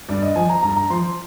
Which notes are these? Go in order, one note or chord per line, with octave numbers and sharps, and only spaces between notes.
G2 D5
D#5
F3 G#5
A#5
G2 A#5
A#5
F3 C6